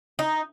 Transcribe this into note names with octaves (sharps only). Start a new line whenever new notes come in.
D#4